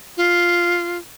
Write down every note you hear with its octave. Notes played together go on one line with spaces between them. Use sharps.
F4